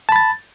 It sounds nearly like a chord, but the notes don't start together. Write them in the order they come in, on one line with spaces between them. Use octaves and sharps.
A5 B5 A6